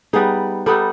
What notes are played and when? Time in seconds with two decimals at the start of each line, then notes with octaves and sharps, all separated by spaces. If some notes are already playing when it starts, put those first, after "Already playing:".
0.13 G3 B3 D#4 G#4
0.66 G3 B3 D#4 A4